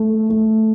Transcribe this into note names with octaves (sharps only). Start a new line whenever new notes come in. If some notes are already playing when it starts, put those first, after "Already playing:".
Already playing: A3
A3